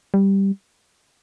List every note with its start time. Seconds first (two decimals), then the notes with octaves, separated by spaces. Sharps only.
0.14 G3